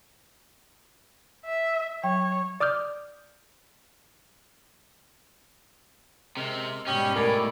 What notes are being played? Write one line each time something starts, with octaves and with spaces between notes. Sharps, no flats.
E5
F#3 C#5 G5
D5 D6 D#6 F6 G6
C3 G#3 A#4
G#2 B2 G3 C#4 G4 D#5 G5
A2 A#4 D5 G#5 B5